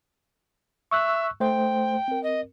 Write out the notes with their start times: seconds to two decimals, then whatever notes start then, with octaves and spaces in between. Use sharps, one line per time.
0.91 E5 C#6 E6 F#6
1.40 A3 C5 G5
2.08 C4 A#4
2.23 D#5